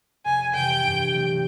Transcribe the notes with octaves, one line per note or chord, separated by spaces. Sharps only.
F1 G#5
F2 C3 E3 G5
G2
D3 F#3 A3 C4